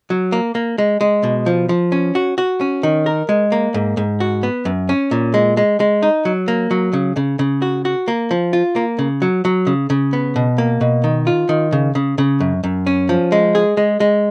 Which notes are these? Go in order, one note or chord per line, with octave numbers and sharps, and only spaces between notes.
F#3
A#3
A#3
G#3
G#3
B2
F3
F3
C#4
F#4
F#4
C#4
D#3
A#4
G#3
A#3
G#2
G#2
F#4
B3
F#2
C#4
A#2
G#3
G#3
G#3
D#4
F#3
A#3
F#3
C#3
C#3
C#3
F#4
F#4
A#3
F3
F4
A#3
C#3
F#3
F#3
C#3
C#3
B3
B2
A#3
B2
D#3
F4
D#3
C#3
C#3
C#3
F#2
F#2
C#4
F3
G#3
G#4
G#3
G#3